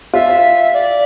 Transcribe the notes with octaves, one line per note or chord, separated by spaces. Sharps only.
F4 E5
D5